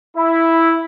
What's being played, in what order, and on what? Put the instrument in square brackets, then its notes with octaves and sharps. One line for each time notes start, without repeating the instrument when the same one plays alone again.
[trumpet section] E4